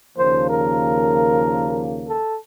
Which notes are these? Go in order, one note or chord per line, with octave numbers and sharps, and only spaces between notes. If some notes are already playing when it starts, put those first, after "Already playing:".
D#2 C#3 F3 A#3 C5
A#4
A4